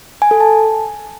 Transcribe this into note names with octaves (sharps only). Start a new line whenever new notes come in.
G#5
A4
A5